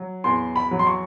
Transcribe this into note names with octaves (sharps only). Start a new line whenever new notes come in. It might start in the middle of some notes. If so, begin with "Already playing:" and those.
Already playing: F#3
E2 C6
B5
F#3
C6
C#6